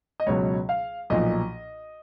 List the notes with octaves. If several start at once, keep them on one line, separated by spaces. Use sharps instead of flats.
D#5
C#2 B2 F#3 C#5
F5
B1 A#2 F3 D#5